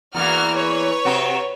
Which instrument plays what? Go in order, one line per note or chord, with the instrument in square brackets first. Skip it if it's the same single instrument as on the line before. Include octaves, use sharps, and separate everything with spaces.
[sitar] E2 E3 A#3 [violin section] F#4 F6
[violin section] B4 C#5
[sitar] C3 C4 F#4